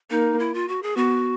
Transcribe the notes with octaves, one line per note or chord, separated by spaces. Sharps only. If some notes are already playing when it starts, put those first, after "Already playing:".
A#3 D#4
E4
F4
F#4
G#4
B3 F#4